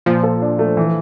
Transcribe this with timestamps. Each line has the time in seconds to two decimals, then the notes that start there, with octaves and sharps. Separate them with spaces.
0.06 A#2 F3
0.23 A4
0.42 D4
0.59 A3
0.77 E3